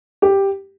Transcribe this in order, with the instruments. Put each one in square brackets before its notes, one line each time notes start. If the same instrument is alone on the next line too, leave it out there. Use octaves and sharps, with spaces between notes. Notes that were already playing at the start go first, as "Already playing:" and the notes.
[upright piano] G4